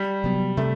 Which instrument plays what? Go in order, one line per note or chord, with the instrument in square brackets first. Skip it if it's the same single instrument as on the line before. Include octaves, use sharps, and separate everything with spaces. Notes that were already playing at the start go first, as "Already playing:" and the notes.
Already playing: [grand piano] G3
[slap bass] C3 F#3 B3
[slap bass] C3 [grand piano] A3